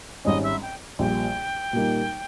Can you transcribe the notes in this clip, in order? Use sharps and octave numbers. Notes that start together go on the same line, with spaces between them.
G#1 G#2 G3 C#4 D#5
E5
G5
A#1 A#2 G3 G5
A#2 G3 A#3 D#4